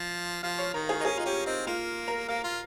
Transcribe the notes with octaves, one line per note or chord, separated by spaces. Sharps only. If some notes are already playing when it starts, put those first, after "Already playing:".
Already playing: F3
F3 F5
C#5
D#3 A#4
G#4
D#4 A#4
C#4 G#4
D#4 F4
C#4 G4
C4 D#4
A#3 F4
A#4
A#3 F5
F4